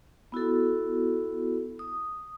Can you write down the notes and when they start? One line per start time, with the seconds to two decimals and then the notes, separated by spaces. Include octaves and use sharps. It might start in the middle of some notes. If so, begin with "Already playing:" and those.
0.32 B3 E4 F#4 A4
1.79 D#6